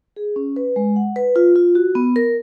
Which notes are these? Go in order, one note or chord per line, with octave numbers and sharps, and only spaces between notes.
G#4
C#4
B4
G#3
F#5
B4
F4
F4
F#4
B3
A#4